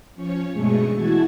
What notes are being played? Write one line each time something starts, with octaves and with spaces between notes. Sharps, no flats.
F3 C#4 C#5
G2 B2 G#3 A3 G#4 C#6
E3 E4 F#4 A5 G#6